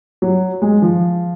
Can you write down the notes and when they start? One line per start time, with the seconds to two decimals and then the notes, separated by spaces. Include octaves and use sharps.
0.22 F#3
0.62 G#3
0.82 F3